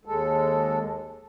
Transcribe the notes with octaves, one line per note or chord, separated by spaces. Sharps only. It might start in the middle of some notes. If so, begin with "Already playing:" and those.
D#2 G#3 A4